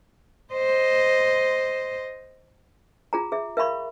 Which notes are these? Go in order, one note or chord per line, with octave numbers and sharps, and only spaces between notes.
C5 D#5
F4 G#4 A#5
G#4 E5
A#4 E5 F5 B5 C#6